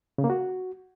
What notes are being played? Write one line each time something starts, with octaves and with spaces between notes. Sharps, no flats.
C#3
A#3
F#4